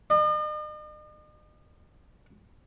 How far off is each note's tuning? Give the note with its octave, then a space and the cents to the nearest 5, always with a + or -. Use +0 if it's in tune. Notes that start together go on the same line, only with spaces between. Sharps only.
D#5 -45